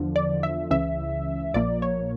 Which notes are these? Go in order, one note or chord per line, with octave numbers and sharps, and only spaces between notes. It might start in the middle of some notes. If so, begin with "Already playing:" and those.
Already playing: E2 D3 F3
D5
E5
C#2 C#3 E3 E5
A#1 A#2 F3 A#3 D5
C#5